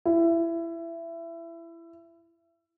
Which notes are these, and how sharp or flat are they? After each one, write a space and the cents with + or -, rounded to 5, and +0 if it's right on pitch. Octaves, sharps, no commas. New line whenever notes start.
E4 +20